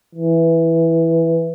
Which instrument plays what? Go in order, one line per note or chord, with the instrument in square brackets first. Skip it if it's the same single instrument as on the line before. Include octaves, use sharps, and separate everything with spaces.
[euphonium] E3